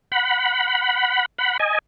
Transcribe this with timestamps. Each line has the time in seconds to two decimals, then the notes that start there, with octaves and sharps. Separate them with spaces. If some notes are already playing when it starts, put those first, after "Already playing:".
0.12 F#5 B5
1.38 F#5 B5
1.59 D#5 G#5